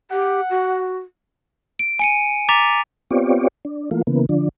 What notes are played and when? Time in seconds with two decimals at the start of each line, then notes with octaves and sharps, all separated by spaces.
0.11 G4 F#5
0.50 F#4
1.79 D7
1.99 G#5 C#7 D#7
2.49 A#5 D6 A6 B6 F7
3.11 B3 C4 F4 G4 C#5 D5
3.65 D4
3.91 E3 A3 A#3 F4
4.07 C#3 E3 A#3 B3
4.29 D3 F3 D4